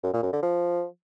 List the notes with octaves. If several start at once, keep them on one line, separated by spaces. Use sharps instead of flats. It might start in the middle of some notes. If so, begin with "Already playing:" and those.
F#2
A#2
F#2
D3
F3